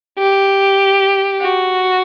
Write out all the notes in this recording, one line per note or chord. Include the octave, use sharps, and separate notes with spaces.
G4
F#4